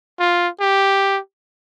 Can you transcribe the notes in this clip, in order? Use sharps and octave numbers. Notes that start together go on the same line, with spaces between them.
F4
G4